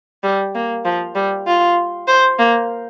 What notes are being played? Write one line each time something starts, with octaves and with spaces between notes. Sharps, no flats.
G3
A#3
F3
G3
F4
C5
A#3